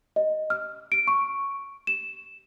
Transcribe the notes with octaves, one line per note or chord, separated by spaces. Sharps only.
D#5
F6
D7
C#6
E7